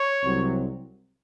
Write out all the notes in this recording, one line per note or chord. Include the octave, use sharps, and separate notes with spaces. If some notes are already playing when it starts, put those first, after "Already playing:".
Already playing: C#5
C2 C3 F#3 C4